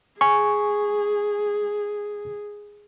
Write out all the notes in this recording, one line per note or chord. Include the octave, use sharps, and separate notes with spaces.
G#4 G#5 C#6